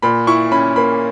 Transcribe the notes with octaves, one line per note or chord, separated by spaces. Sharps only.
A#2 B5
E4 C#6
C#4 B5
A#3 B5